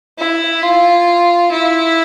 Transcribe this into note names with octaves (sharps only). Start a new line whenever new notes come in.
E4
F4
E4